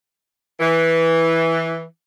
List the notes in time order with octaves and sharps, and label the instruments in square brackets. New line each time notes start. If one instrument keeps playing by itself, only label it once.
[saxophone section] E3